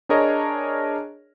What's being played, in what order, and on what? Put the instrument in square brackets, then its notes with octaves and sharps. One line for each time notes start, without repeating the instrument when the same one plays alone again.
[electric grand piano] D4 G#4 A#4 C#5 D#5